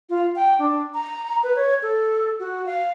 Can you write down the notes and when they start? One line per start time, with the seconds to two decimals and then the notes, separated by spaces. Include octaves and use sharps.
0.10 F4
0.36 G5
0.59 D4
0.94 A#5
1.43 B4
1.56 C#5
1.82 A4
2.39 F#4
2.66 F5